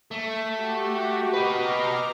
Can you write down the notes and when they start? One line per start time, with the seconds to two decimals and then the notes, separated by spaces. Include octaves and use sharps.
0.11 A3 E7
0.53 F#4 G4
1.34 B4 D#5 A#5 D6 F6